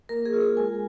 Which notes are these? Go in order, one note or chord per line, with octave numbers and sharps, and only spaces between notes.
A#3 A#4
G#4
F4
A#4
G#3 G#5